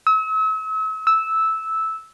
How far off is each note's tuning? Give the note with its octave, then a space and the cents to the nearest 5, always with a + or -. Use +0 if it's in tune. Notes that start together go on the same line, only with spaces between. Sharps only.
E6 -40
E6 -10